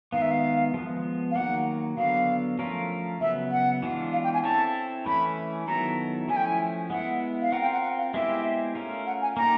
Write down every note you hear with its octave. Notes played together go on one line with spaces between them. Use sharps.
D#3 G#3 B3 F5
E5
F5
F3 G#3 B3
F5
D#3 F#3 A#3 F#5
D3 F#3 B3 F5
F3 A3 C#4 F4 A#4
C#3 F#3 B3 E5
F#5
E3 G#3 B3 D4 F4
F5
G5
G#5
C4 E4 A4 C#5 A5
E3 A3 C#4 E4 B5
D#3 F#3 B3 E4 A4 A#5
F3 A3 C#4 E4 G#5
G5
G#5
G#3 B3 E4 F#5
F5
C4 F4 A#4 F#5
G5
F#5
F#5
F5
G#3 B3 E4 G4 C5 E5
A3 C#4 F4 A#4
F#5
G#5
A#3 D#4 G4 A#5